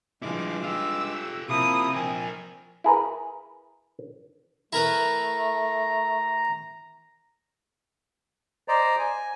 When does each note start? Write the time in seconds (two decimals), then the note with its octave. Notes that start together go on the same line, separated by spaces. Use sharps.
0.22 G2 F3 G#3 E4 D6
0.63 F4 G4 E6
1.49 C3 F3 A#3 E4 D#6
1.94 F3 C4 A#4 G#5
2.84 E4 G#4 A#4 B4
4.73 A3 E4 A#4 B4 A#5
8.68 C5 D5 D#5 A#5
8.98 G#5